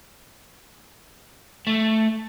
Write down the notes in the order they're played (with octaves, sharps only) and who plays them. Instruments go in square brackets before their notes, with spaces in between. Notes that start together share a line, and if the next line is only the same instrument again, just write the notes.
[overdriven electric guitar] A3